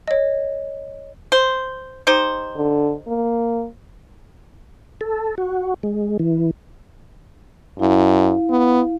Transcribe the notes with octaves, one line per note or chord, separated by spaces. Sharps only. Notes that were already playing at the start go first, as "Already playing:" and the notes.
C#5 D#5
C5
D#4 G4 C5
D3
A#3
A4
F#4
G#3
E3
F#2 E4 F5
B3